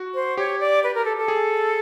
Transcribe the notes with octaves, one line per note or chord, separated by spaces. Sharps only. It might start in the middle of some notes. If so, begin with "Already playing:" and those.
Already playing: F#4
C5
G4 C#5
D5
B4
A#4
A4
A4
G#4